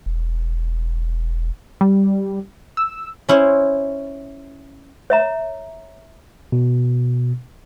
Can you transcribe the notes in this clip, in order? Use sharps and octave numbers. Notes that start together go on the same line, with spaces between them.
E1
G3
E6
C#4 E4 C5 C#5
C#5 E5 A#5
B2